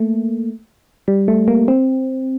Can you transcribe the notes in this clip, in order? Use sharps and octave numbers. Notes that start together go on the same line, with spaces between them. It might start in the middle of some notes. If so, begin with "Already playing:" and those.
Already playing: A3 A#3
G3
A3
A#3
C4